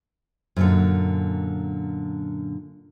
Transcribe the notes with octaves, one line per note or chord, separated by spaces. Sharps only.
F#2 A#2 D3